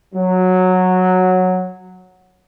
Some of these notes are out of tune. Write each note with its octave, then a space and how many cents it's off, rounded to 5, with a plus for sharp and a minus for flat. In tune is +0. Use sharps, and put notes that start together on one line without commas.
F#3 -10